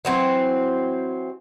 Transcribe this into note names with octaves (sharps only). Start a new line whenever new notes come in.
E3 F#3 C4